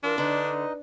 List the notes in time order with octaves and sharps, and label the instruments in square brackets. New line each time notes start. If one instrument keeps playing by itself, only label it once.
[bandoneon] E3 F4 E6 [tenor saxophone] D4 [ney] A#4
[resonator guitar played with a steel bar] D3 [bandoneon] D#4 D#5 [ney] B4